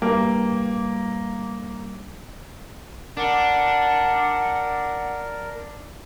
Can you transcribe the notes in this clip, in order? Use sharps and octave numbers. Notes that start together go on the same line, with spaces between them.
G2 A#3
D4 A#4 F#5